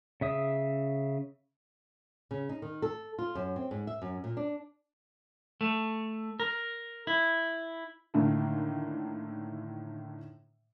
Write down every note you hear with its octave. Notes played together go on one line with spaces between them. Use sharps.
C#3 E5 D#6
C#3
D#4
D#3
A4
F4
F#2
C4
G#2
E5
F#2
A#2
D4
A3
A#4
E4
A2 D3 D#3 A3 A#3